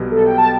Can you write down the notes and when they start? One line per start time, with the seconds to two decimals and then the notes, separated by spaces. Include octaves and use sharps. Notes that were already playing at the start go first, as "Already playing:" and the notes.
Already playing: B1 B2 G3
0.12 A4
0.26 G5
0.38 A5